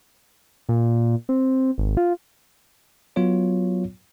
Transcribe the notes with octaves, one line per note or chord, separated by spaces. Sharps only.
A#2
C4
G#1
F4
F#3 B3 F4 C#5